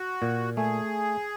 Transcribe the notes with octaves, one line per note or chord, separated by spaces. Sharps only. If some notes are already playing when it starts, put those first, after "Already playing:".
Already playing: F#4
A#2
A3 G#4